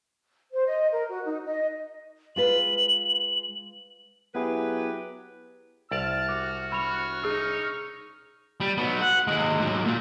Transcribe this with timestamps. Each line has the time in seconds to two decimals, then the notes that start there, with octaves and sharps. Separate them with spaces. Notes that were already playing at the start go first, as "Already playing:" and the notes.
0.53 C5
0.66 D#5
0.92 A#4
1.10 F#4
1.25 D#4
1.46 D#5
2.36 G#3 F4 B4 F#7
4.35 F#3 B3 E4 G4 G#4 B4
5.91 C2 D5 A5 F6
6.29 F#4 D6
6.72 B5 C#6 F6 F7
7.23 D#4 G#4 E6
8.60 G3
8.78 F#3 B3
9.01 F#5
9.27 D#2 G#3
9.59 G#2 F#3
9.85 A#2